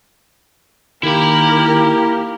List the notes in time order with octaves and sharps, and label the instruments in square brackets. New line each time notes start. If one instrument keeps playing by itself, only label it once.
[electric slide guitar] D#3 [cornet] A#3 [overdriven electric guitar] E4 B5 [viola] G4 A#4